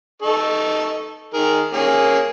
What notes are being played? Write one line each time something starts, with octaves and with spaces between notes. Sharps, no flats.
D#4 A4 C#6
D#3 G#4 A#4
A#3 C#4 G#4